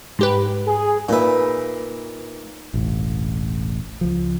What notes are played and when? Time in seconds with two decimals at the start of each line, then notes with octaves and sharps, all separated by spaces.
0.19 G#2 G4 B4
0.67 G#4
1.09 A#2 D#4 B4 E5
2.74 E1 A1
4.01 C#2 F3